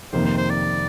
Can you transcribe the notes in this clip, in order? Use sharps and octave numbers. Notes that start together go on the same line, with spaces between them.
F2 C3 D#3 A#3 C5
C5
C5
D5